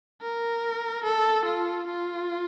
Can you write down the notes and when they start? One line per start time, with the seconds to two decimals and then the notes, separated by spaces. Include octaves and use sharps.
0.22 A#4
1.04 A4
1.45 F4
1.87 F4